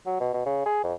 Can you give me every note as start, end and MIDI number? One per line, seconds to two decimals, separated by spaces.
0.06 0.18 54
0.20 0.31 47
0.34 0.45 47
0.46 0.64 49
0.65 0.83 68
0.84 0.93 41